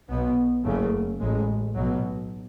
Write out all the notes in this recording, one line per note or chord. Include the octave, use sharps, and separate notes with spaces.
B1 B2 B3
F#1 F#2 C#3 A3
A1 A2 G#3
B1 B2 F#3